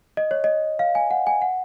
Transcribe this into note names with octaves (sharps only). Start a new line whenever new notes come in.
D#5
C#5
D#5
F5
G#5
F#5
G#5
F#5